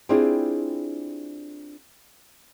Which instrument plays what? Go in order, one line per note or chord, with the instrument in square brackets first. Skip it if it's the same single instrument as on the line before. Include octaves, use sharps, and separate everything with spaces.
[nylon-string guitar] C4 D4 E4 F4 G4 G#4